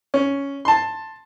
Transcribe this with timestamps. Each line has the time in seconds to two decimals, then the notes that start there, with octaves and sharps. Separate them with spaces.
0.14 C#4
0.65 A5 C6